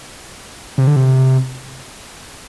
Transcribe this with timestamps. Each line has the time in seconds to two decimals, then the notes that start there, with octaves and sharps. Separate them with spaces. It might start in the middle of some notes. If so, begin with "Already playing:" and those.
0.78 C3
0.87 D3
0.96 C3